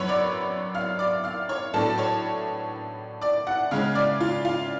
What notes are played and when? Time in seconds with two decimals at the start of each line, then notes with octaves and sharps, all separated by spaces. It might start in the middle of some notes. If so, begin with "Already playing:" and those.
Already playing: F#2 B4 C#5 B5 C#6
0.09 D5 D6
0.75 F5 F6
0.99 D5 D6
1.24 F5 F6
1.49 C#5 C#6
1.74 A2 F#3 B3 D4 A4 A5
1.98 C#5 C#6
3.22 D5 D6
3.47 F#5 F#6
3.71 C#3 G#3 C#4 F5 F6
3.95 D5 D6
4.20 F4 F5
4.45 F4 F5